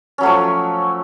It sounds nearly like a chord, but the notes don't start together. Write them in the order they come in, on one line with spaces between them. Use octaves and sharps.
C#4 F#3 A3 F3